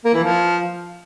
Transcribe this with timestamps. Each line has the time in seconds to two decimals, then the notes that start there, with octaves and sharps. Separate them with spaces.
0.05 A#3
0.14 E3
0.23 F3